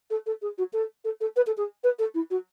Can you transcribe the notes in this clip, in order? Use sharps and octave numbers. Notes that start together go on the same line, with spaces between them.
A4
A4
G#4
F#4
A4
A4
A4
B4
A4
G#4
B4
A4
E4
F#4